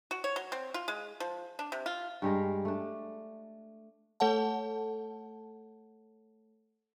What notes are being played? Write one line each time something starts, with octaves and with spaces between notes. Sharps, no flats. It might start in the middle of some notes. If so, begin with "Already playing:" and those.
F#4
C#5
F#3
C4
F4
G#3
F3
D4
C3
F4
G2 G3 G#3 A#4
A3 D4
A3 A4 C#5 F#5 A5